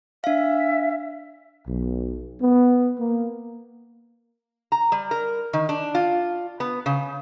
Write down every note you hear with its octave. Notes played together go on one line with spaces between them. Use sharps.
D4 E5 F5
B1
B3
A#3
A#5
G3
A#4
D#3
D4
F4
B3
C#3